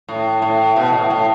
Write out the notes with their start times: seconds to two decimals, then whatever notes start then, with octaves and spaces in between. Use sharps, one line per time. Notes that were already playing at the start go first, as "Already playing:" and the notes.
0.09 A2
0.42 A2
0.76 B2
0.93 A2
1.10 A2